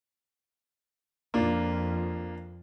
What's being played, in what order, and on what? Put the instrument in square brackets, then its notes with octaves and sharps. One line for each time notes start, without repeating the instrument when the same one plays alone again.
[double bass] F2 [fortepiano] A#3 D4 F4